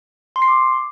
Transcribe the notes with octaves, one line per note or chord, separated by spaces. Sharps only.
C6
C7
D6